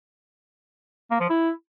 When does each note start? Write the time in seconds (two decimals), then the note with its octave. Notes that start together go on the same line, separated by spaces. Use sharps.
1.11 A#3
1.20 F3
1.30 E4